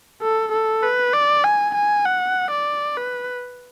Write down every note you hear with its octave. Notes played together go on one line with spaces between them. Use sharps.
A4
A4
B4
D5
G#5
G#5
F#5
D5
B4